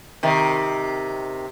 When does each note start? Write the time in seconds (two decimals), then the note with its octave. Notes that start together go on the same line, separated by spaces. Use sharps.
0.23 C3 D#3